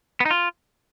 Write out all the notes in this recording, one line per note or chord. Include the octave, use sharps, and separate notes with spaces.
B3
D#4
F4